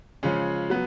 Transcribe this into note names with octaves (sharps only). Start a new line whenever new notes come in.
C#3 F3 G#3 C#4
F#3 B3